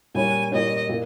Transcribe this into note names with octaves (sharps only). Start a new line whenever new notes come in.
A#2 G3 C#4 G#5
A#2 G3 C#4 D#5
A#2